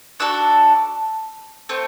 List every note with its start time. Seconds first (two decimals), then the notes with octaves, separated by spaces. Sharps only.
0.20 D4 F#4 A4 E6 F#6
1.69 A3 C4